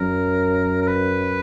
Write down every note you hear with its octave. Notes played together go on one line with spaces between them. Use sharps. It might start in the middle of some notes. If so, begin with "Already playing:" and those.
Already playing: F#2 A#4
A#4
B4